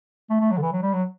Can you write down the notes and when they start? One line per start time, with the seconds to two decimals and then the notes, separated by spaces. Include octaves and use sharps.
0.30 A3
0.40 A3
0.51 F#3
0.57 D3
0.62 E3
0.72 F#3
0.82 G3
0.93 F#3